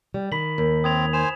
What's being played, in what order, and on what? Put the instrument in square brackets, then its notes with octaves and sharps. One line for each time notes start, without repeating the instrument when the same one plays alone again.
[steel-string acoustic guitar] G3
[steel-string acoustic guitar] D#3 [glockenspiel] B5 B6 F#7
[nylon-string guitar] D#2
[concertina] C4 [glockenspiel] D#6 G#6 F7
[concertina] C5 G#5 [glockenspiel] E7